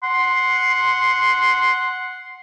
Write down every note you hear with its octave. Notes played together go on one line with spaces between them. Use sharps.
F#5 C6